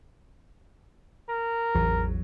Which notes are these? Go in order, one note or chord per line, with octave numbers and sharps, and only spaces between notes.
A#4
A1 E2 F#3